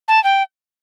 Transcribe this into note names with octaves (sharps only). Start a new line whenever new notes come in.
A5
G5